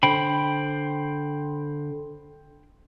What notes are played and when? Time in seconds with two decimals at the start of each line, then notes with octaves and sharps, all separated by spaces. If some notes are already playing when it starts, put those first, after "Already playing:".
0.03 D3 C5 G5 B5